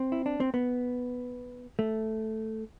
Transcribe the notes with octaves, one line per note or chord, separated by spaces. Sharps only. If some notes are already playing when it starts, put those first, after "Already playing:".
Already playing: C4
E4
D4
C4
B3
A3